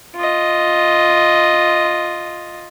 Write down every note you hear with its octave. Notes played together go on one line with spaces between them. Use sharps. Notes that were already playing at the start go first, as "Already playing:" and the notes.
F4 D#5